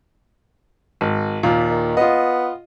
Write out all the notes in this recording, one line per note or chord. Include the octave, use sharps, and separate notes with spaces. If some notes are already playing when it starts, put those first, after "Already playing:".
G#1
D#2 A#2 F4
D#3
B3 F4 D#5